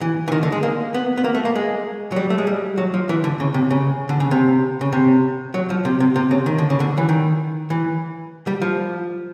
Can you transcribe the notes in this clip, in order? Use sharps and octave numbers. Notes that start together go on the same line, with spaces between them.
E3
E3
D#3
D3
G#3
A#3
B3
B3
A#3
A3
A#3
G#3
F#3
G3
A3
G#3
G3
F#3
F3
E3
D3
C#3
C3
C#3
D3
C#3
C3
C#3
C3
F#3
F3
C3
C3
C3
C#3
D#3
D3
C#3
D3
E3
D#3
E3
G3
F3